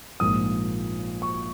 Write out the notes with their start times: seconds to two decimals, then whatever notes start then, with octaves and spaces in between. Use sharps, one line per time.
0.20 A#1 G#2 F3 A#3 D#6
1.22 C#6